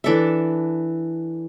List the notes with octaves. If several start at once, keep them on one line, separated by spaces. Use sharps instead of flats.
E3 D4 A4 E5